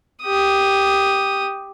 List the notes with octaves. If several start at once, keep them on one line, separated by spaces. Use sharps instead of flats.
G4 D#6